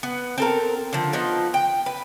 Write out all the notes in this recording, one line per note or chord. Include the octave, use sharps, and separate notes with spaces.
B3
C4 A4 A#4
D3 F3
F3 B3 D#4
G5
B4